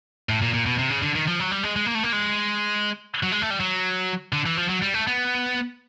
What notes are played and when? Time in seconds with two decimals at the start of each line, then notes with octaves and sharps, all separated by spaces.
0.29 A2
0.41 A#2
0.54 A#2
0.66 B2
0.78 C3
0.90 C#3
1.02 D3
1.15 D#3
1.28 F3
1.40 F#3
1.51 G3
1.63 G#3
1.76 G#3
1.86 A#3
1.95 A3
2.03 A#3
2.13 G#3
3.23 F#3
3.32 G#3
3.42 A3
3.50 G3
3.60 F#3
4.33 D3
4.46 E3
4.57 F3
4.69 F#3
4.82 G3
4.94 A3
5.07 B3